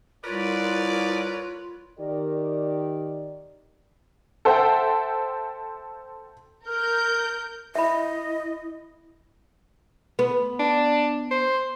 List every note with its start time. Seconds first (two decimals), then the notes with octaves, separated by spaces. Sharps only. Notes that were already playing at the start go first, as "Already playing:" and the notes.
0.24 C2 F4 A#4 B4 C#5 D5
1.99 D#3 G4 A#4 D5
4.45 A4 C5 E5 F#5 G5
6.66 A#4 F6 G6
7.75 E4 D#5 E5 B5
10.19 B3
10.60 D4
11.31 C5